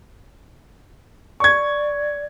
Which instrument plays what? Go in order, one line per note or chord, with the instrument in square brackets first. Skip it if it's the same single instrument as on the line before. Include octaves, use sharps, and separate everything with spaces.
[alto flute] D5 [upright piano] C#6 G#6